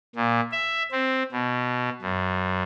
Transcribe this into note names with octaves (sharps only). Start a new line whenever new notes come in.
A#2
E5
C4
B2
F#2